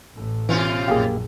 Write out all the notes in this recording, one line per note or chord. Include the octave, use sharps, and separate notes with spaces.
A1 A2
B2 E3 C#4 F4
A#1 F#2 A#3 G4 G#4 F5